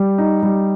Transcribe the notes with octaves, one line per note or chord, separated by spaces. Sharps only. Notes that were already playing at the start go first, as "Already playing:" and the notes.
Already playing: G3
D#4
G3